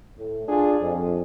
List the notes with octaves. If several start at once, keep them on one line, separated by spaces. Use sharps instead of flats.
A2
D4 F4 G#4
F2